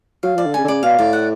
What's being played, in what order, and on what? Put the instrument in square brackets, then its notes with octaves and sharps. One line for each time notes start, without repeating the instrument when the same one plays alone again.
[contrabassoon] F#3 [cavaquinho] F5
[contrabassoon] F3 [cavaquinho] D5
[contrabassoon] D3
[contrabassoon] C#3 [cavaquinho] G#5
[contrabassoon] D3
[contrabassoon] C#3 [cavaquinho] D5
[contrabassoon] B2 [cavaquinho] F5
[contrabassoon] A2 [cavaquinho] D5
[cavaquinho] F#5